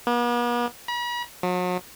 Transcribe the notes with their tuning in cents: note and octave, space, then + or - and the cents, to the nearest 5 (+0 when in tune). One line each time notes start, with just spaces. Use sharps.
B3 -45
B5 -45
F#3 -40